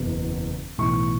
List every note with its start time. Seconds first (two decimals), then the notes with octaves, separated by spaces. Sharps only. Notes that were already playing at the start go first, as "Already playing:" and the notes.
Already playing: F#1 E2 B2 F#3
0.78 B1 A2 E3 C#6